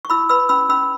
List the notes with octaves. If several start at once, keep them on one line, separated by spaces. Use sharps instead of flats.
C#6
E4 B5 E6
B4 B5 E6
C#4 B5 E6
C#4 B5 E6